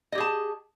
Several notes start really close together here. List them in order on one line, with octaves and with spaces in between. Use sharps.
D#5 G4 G#4 A5